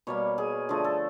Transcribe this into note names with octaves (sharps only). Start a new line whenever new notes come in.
B2 G3 A#3 C#5
G#4
D3 F3 A3 G#4
A4